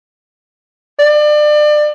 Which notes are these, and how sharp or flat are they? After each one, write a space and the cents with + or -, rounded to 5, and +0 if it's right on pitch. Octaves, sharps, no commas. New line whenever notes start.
D5 +30